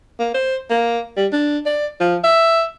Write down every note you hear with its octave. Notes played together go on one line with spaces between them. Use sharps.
A#3
C5
A#3
G3
D4
D5
F3
E5